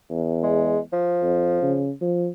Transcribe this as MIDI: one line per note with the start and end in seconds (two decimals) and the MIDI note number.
0.10 0.80 40
0.43 0.79 56
0.93 1.83 53
1.23 1.58 41
1.62 1.91 49
2.01 2.28 53